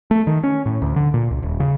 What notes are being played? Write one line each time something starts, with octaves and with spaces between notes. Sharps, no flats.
A3
D#3
C#4
A2
D2
D3
A#2
C#2
D#1
C#3